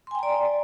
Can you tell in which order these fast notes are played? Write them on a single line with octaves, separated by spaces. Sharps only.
C6 G#5 G5 A#5 D5